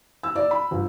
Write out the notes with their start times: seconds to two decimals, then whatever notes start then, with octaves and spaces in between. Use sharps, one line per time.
0.23 E6
0.36 D5
0.51 B5
0.71 G1